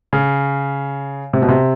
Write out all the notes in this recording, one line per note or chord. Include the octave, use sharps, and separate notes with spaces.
C#3
C3
B2
C3